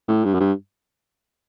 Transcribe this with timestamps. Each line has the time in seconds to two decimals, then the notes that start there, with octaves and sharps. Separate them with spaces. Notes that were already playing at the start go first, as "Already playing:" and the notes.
0.08 A2
0.25 G2
0.34 F#2
0.40 G2